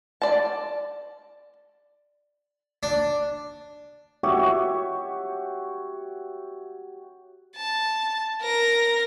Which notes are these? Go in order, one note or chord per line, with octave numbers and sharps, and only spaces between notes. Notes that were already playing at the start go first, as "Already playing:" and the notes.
D5 A5
D4
F#4 G4 C#5 E5
A5
A#4 A#6